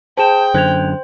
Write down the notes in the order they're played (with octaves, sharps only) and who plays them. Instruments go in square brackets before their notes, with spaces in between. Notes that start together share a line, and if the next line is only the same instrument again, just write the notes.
[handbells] G#4 C5 [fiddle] G5 [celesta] A5 E7
[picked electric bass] F#2 D3 [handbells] C5 [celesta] F#6 G#6 F7